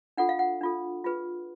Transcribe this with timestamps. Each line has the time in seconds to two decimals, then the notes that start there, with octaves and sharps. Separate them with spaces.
0.18 D4 F4 A4 F#5
0.29 F5
0.39 F#5
0.61 D4 F4 A4
1.04 F4 G#4 B4